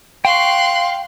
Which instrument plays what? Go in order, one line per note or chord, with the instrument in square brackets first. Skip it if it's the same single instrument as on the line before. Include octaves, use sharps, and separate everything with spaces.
[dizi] F5 [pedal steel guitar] G5 C#6 [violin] C6 F#6